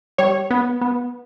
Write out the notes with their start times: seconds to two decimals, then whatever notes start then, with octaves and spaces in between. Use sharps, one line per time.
0.18 G3 C#5
0.51 B3
0.81 B3